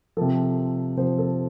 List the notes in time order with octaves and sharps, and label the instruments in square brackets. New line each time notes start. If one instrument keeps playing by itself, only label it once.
[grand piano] C3 F3 A4
C3 F3 C5
A4